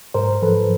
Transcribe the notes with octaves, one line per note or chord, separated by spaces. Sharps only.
G#2 A#4 C5
F3 A4 B4